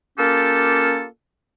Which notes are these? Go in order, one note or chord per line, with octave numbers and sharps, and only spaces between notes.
A#3 C#4 F4 G4 A4